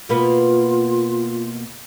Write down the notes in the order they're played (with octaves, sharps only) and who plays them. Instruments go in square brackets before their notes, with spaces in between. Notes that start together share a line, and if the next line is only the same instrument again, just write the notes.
[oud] B2 A#3 B4 [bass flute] F4